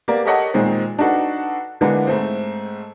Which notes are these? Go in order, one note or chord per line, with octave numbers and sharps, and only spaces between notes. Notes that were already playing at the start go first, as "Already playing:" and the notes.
A#3 B3 G4 D5
G4 A4 A#4 C#5 D#5 F#5
A#2 D#3 G#3 C4
D4 D#4 F#4 A4 B4
D3 E3 G#3 A#3 B3 D4
G#2 A3 C4